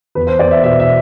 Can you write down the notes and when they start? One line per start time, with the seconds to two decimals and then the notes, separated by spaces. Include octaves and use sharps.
0.15 E2 B4
0.27 C5
0.39 E2 D5
0.51 E5
0.63 B2 E5
0.80 E5